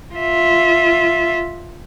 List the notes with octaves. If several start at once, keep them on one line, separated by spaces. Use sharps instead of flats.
F4 E5